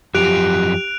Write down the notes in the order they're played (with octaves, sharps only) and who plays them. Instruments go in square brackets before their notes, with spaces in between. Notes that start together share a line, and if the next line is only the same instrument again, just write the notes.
[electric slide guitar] F#2 F3 [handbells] G4 [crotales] F#6 D7 F7